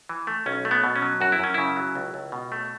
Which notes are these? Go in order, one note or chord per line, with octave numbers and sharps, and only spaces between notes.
E3
A3
B1 C#4
A3
B3
B2
C#4
F#3
F#2 F#4
E4
F#2 C#4
C#3 E4
F#3
C#2
C#2
B2
A3